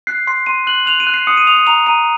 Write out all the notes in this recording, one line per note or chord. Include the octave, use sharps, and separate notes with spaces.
F#6 C7
C6 C7
C6 D#7
F#6 F#7
F#6 F7
D#7
F#6
C7
D#6 C#7
D#7
D#6 F7
D#7
A#5 F7
A#5 D#7